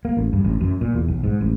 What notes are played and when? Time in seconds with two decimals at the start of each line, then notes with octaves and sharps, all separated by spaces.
0.05 A#3
0.17 A1
0.33 G2
0.44 A1
0.61 F#2
0.81 A#2
0.94 E2
1.08 B1
1.23 G#2
1.41 A1